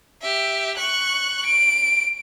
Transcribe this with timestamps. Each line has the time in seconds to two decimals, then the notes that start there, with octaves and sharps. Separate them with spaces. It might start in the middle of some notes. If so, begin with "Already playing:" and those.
0.21 G4 E5
0.77 C#6 F#6
1.45 D7